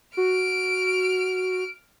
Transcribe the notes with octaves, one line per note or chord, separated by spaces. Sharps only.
F#4 F6 D7